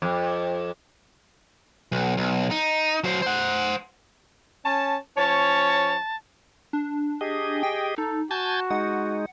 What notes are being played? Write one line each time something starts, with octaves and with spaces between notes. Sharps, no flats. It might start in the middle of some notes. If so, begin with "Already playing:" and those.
F2
B1
B1
D#4
F#3 C5
C5 F#5
C#4 A5
F3 C#4 C#5 A5
D4
G4 G#4 D#5
G5
D#4 A4
F#4 G#5 A5 G6 A6
G#3 D#4 F#5